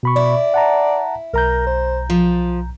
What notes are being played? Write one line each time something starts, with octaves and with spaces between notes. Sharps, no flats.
B2 B5 C#6
E4 D5
F#5 A5 A#5
B1 A#4 A#5 G6
C5
F3 F4